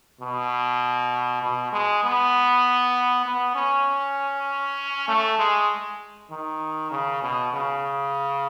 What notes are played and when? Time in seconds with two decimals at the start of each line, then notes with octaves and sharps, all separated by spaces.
0.21 B2
1.43 B2
1.73 G#3
2.04 B3
3.26 B3
3.55 C#4
5.08 A3
5.39 G#3
6.31 D#3
6.91 C#3
7.23 B2
7.53 C#3